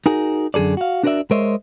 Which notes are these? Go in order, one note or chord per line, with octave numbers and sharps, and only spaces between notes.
D#4 F#4 G#4 A#4
F#2 D3 G#4 A4 D5
F#4 F5
D4 F#4 A#4 B4 D5 E5
G#3 A#4 C5 C#5 D#5 E5